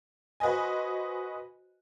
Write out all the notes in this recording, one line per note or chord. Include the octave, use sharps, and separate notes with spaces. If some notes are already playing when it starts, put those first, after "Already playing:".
F#4 B4 C5 D#5 G#5